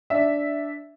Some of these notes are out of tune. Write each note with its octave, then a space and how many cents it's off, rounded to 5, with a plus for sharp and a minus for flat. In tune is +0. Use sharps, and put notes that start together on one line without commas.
D4 -5 E5 -5